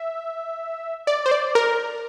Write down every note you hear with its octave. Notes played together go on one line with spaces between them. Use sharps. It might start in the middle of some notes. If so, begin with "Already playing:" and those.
Already playing: E5
D5
C5
D5
A#4